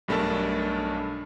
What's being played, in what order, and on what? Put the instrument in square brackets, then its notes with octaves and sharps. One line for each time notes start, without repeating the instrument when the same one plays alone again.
[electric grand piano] B1 G2 A3 D4 A#4 A5